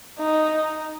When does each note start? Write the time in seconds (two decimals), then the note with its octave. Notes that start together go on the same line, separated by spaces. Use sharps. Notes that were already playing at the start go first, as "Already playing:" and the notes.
0.19 D#4